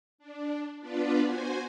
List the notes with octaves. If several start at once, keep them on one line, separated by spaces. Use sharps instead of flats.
D4
B3 D4 F4 B4 D5
F#4 C5 G#5